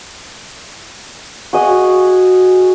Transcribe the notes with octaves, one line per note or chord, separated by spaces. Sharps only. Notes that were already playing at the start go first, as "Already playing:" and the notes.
F#4 G#4 D#5